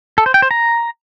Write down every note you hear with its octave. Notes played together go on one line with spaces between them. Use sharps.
A4
C5
G5
C5
A#5